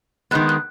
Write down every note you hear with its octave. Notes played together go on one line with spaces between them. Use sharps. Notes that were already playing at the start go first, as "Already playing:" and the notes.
D#3 G#3 B3 F#6
F#6